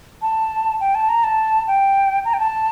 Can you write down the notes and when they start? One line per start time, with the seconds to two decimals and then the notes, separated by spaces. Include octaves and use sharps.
0.22 A5
0.80 G5
0.95 A5
1.09 A#5
1.24 A5
1.67 G5
2.25 A#5
2.34 G5
2.40 A5